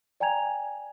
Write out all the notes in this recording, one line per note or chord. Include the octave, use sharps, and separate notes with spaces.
D5 G5 G#5 A#5 G#6 F7